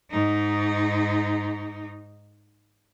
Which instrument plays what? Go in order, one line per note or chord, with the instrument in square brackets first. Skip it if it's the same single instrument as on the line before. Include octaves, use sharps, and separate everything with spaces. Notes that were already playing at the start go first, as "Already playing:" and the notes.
[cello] G#2 D#4